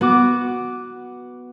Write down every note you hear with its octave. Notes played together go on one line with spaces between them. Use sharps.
B3 F#4 D6